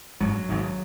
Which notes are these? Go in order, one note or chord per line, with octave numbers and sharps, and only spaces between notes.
G#1 G#2 F#3
G#1 G#2